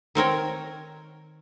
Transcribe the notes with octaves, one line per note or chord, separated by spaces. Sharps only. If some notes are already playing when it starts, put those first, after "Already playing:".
D#3 C4 A#4 C#5